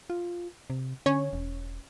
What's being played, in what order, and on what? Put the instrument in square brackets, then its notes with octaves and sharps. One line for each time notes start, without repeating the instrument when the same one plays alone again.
[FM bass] F4
C3
[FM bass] D3 [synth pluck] C#4 C#5
[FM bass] E1